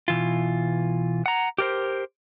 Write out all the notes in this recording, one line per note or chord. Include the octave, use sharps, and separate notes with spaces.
B2 E3 F4
F#5 A#5
G4 A#4 C5